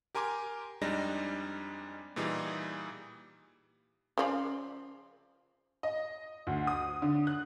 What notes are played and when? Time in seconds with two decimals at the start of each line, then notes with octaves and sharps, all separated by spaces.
0.15 G4 A#4 G#5 C6 D6
0.81 F2 G3 G#3 D4 D#4 A#6
2.16 A#2 E3 G3 D#4 G#4
4.18 C#3 F3 D5
5.83 D#5
6.47 D2
6.67 D#6
7.02 D3
7.27 F#6